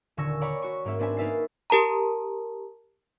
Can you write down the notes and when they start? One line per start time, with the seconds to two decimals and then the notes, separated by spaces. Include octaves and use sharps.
0.17 D#1 D3 G#5 C#6 E6 A#6
0.41 C#5 D5 F#5 A#5 B5 C#6
0.62 F#4 C#6
0.85 G#2 A#3 C#4 E5
0.99 B3 C4 D4 E5 G#5 B5
1.17 A#3 D#4 B4 E5 A6 C7
1.70 G4 A#4 A5 A#5